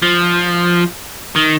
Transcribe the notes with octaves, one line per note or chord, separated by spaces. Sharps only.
F3
D#3